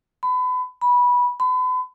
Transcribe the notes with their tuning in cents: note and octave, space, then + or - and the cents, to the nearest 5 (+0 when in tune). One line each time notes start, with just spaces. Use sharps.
B5 +30
B5 -15
B5 +40